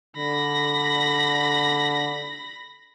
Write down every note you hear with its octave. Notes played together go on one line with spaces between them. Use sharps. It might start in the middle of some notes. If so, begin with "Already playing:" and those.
D3 B5 A#6